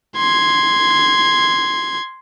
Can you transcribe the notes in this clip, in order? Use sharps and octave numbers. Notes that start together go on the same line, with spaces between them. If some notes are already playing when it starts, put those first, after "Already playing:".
C6 G#6